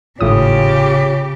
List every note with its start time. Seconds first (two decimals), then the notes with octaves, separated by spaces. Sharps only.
0.21 G#1 A2 C#3 F4 G4 C#5 D#6